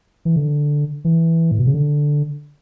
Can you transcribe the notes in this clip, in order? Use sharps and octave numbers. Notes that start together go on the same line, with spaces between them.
E3
D3
E3
A2
B2
C#3
D3